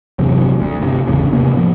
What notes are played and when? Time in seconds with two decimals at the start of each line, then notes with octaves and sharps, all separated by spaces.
0.19 G1 E2 C3 F#3
0.59 D2
0.81 G1 C3
1.08 G#1 E2 A2 C#3
1.33 C3 A#3 B3
1.53 A2 F3